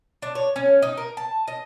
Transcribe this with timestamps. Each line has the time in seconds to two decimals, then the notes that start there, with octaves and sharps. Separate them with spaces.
0.22 D4
0.35 C#5
0.56 C#4
0.82 D#4
0.97 A#4
1.17 A5
1.48 D#5